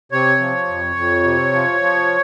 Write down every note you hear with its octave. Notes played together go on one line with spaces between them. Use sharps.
C3 C#5
F3
F2
F2
C3
F3
F3